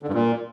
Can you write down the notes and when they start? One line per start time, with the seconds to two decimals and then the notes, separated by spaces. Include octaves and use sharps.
0.02 D3
0.08 G2
0.14 A#2